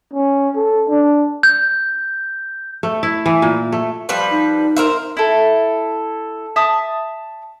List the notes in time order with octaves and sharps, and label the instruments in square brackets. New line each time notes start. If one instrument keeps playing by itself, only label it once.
[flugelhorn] C#4
A4
D4
[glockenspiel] G6
[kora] A3
E4
E3
A#2
A3
[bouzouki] F3 G3 B4
[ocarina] D#4
[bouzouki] A#4 C5 E5
[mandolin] E4 A4
E5 A5 D#6